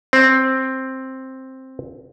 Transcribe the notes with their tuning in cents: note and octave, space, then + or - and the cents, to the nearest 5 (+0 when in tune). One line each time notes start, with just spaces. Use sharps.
C4 +5